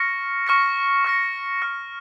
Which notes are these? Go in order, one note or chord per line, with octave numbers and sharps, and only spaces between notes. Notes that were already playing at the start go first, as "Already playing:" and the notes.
Already playing: C#6 F6 A#6 C#7
C#6 F6 A#6 C#7
C#6 F6 A#6 C#7
C#6 F6 A#6 C#7